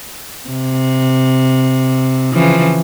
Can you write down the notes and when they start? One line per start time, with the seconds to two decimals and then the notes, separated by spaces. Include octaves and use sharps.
0.49 C3
2.32 C#3 E3 F3